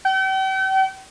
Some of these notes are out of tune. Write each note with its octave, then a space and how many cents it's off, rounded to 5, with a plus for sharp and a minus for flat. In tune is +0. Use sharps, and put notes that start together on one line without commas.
G5 -40